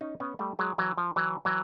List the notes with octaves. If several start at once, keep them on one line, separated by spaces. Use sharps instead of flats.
C#4 D#4
B3 C#4
G3 A3
F#3 G#3
E3 F#3
F3
E3 F#3
E3 F#3